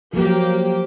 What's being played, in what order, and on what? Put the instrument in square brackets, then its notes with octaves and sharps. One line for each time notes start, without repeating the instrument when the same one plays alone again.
[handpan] F3 F#3 [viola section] A#3 G4